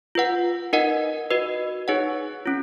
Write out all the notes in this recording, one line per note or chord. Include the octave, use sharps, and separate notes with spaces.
F4 B4 F#5
D#4 A#4 D#5 F#5
F#4 B4 D#5
D#4 G#4 C#5 F#5
C#4 F4